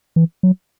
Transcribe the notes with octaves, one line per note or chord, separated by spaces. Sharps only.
E3
F#3